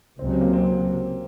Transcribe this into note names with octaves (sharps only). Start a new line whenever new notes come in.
C#2 C3 F#3 C4
C4
A#3
C4